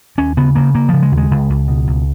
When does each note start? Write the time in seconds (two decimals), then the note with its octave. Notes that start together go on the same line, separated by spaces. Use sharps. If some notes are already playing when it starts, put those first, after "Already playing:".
0.18 D#2 C#4
0.37 C#3 B3
0.55 C#3 A#3
0.75 C#3 A#3
0.89 C#3 F3
1.03 G#3
1.12 D#2
1.17 G#3
1.31 C#2
1.50 C#2
1.68 B2
1.88 C#2